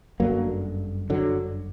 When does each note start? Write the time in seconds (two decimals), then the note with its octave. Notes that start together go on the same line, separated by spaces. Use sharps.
0.20 G1 F#2 D3 F#3 A#3
1.10 D3 F#3